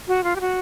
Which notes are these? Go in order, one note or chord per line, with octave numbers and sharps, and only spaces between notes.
F#4
F4
G4
F#4